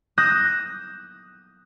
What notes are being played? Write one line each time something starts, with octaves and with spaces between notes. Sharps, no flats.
D#6 F#6 G6 A#6 E7